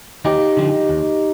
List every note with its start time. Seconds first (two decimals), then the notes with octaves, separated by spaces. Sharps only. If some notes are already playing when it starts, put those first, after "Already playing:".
0.25 D#2 D#4 G4
0.57 D3 F3
0.89 D#2